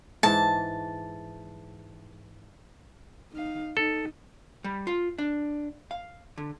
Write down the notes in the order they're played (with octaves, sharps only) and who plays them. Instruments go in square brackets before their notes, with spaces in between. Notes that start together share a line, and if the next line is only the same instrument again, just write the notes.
[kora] G#2 E3 [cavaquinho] A5
[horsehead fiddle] D#4 F5
[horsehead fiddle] D#4 [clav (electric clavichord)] A4
[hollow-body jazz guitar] G3
F4
D4
F5
D3